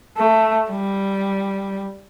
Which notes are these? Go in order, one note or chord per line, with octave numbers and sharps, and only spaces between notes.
A3
G3